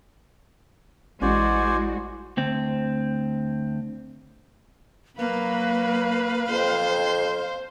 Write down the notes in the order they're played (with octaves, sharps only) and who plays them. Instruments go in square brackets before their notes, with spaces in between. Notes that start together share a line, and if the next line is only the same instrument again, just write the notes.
[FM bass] A1 [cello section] G#3 F#4 [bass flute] E4 [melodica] C5 D5 G#5
[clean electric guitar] D2 C4
[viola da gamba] F#3 A#3 [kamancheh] B4 [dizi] F5
[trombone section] F2 [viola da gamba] C5